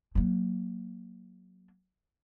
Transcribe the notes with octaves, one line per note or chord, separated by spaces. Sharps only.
F#3 A#3